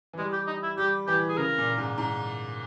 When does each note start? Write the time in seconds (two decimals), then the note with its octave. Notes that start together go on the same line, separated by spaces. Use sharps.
0.13 E3
0.18 G3 G#3
0.33 G4
0.47 D#4
0.63 E4
0.78 G3 G4
1.07 E3 G4
1.29 G#4
1.38 C#3 A#4
1.58 A#2
1.78 G#2
1.98 G#2